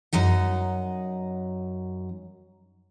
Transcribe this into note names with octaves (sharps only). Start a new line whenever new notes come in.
F#2 F#3 D#4 F#5